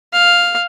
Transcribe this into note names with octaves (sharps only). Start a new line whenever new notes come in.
F5